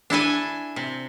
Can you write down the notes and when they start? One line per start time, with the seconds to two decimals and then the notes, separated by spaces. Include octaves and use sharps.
0.10 D4 E4 A4 G#5
0.76 C3